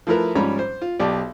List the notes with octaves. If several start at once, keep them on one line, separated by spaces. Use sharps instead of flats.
F3 A3 E4 A#4 B4
G#2 F3 G3 C#4 A#5 B5
C5
F4
B1 G4 D5 A5